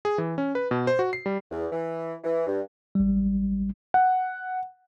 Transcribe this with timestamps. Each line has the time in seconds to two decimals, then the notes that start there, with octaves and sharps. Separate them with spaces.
0.05 G#4
0.18 E3
0.38 C#4
0.55 B4
0.71 B2
0.87 C5
0.99 F#4
1.13 C7
1.26 G3
1.50 E2
1.72 E3
2.24 E3
2.46 G2
2.95 A1 G3
3.94 F#5